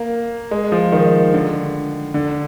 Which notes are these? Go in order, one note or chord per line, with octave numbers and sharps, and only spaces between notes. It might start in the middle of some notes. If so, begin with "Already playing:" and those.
Already playing: A#3
G#3
F3
D#3
D3
D3